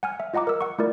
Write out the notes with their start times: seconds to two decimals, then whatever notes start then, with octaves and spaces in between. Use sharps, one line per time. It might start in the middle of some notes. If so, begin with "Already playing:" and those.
0.03 F#5 G#5 F6
0.20 E5
0.34 F4 D#5 F#5 A#5 D6
0.47 A#4 E6
0.61 F#5 C#6
0.79 A3 E4 F4 A#4 D5